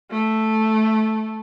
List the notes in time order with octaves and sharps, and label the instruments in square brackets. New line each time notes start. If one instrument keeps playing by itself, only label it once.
[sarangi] A3